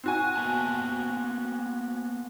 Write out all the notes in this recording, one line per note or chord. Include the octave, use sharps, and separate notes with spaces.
C4 F#4 G#5
A#3 B3 A5